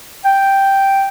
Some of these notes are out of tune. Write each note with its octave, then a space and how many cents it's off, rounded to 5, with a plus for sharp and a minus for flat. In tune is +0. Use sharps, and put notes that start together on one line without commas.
G5 +0